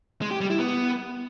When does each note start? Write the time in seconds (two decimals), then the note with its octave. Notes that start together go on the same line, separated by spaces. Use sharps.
0.22 G#3
0.31 G4
0.41 G3
0.50 E4
0.59 B3